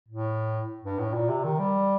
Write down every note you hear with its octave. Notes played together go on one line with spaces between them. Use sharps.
A2
G2
A2
A#2
C3
D#3
G3